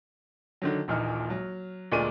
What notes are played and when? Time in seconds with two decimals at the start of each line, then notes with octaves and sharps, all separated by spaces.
0.62 D3 D#3 F#3
0.88 D#1 A#1 A#2 E3 D#4 F6
1.30 F#3
1.92 D2 A#2 G#3 A#3 D5 D#7